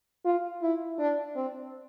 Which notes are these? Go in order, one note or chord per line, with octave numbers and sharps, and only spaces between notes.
F4
E4
D4
C4